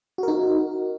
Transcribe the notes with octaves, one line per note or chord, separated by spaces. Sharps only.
D#4 F#4 A#4